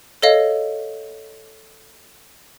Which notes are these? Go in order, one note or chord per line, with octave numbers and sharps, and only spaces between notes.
A4 C#5 D#5 F5